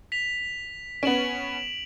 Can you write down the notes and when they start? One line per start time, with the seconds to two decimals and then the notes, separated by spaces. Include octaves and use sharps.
0.12 B6 F7
1.03 B3 C#4 D7 E7 F#7